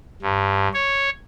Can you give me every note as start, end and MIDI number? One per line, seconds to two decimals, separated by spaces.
0.22 0.68 43
0.73 1.10 73